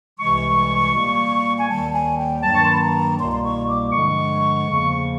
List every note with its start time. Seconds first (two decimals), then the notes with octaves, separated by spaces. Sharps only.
0.19 C2 C3 E3 G#3 C#6
0.94 A#2 G3 A#3
1.58 G#5
1.69 D#2 D#3 G3 A#3 A5
1.93 G#5
2.18 G5
2.43 G2 D#3 F#3 A#3 A5
2.55 C#6
2.64 C6
2.72 B5
2.81 A#5
3.17 C2 B2 G3 A#3 C6
3.32 C6
3.43 C#6
3.68 D6
3.92 G2 D3 F3 G#3 C#6
4.68 E2 C#3 F3 A#3